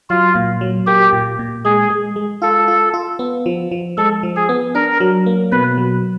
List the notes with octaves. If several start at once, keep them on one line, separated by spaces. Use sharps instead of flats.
F#3 F4
A#2
F#3
A#3 G4
A#2
A#2
G#3 G#4
G#3
G#3
F4 A4
F4
F4
B3
F3
F3
G#3 A4
F3
G#4
B3
D4 A#4
F#3
A#3
B2 B4
F#3